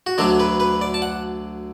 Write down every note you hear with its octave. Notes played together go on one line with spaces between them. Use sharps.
F#4
D2 D3 F#3 D4 A4
B4
B4
D5
A5
F#5